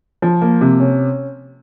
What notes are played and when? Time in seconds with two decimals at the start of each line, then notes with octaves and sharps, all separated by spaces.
0.22 F3
0.42 A#3
0.61 C3
0.80 C#4